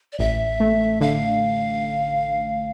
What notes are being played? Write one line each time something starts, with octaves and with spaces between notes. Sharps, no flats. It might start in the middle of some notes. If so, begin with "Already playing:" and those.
D5
A1 E5
A3
D3 F5